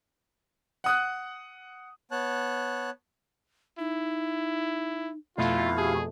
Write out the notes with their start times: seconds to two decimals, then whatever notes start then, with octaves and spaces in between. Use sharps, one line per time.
0.84 F#5 D#6 F#6
2.11 B3 C#5 A5 F#6
3.79 D#4 E4
5.38 F2 B2 A3 E4 F4 F5
5.78 G4 G#4